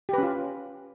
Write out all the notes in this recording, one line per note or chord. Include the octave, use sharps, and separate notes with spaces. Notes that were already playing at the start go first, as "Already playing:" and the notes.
C#4 F4 G4 B4